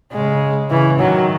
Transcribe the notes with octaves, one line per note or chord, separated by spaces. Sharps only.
C#3 G#3
C#3 E3
D#3 F#3